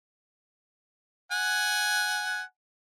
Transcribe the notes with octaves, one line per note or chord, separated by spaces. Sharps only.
F#5 G#5